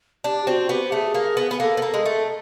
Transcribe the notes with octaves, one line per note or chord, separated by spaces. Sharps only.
D4 G4
C4 F#4
B3 G4
A3 G#4
A#3
B3
B3
G#4
A#3 A4
B3
A#3
G#3
A3